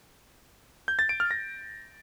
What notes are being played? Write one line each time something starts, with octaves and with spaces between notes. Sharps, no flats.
G6
A6
D7
F6
A#6